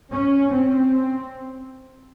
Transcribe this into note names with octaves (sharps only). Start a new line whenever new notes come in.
C#4
C4